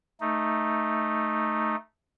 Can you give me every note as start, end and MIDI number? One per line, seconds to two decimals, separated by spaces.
0.21 1.76 57
0.21 1.76 63